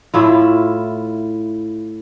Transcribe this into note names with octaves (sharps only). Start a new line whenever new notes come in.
A2 E4 F4